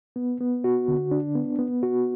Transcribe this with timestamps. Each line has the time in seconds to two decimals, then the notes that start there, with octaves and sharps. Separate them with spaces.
0.16 B3
0.40 B3
0.64 F#4
0.88 D3
1.11 D4
1.35 B3
1.59 B3
1.83 F#4